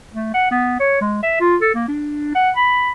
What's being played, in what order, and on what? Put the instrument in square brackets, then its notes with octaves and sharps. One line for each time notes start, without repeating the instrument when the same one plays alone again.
[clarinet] A3
F#5
B3
C#5
G#3
E5
F4
A4
A#3
D4
F#5
B5